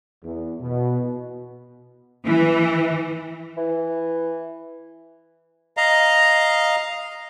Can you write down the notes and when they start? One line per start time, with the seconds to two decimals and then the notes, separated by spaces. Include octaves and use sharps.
0.23 E2
0.61 B2
2.25 E3
3.58 E3
5.77 D#5 F5 A#5